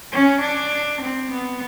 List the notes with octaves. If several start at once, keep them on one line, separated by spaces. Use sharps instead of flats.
C#4
D4
C4
B3